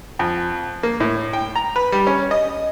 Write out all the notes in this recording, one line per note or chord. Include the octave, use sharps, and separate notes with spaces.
F2
A#3
A2
G5
A#5
B4
G3
C#4
D#5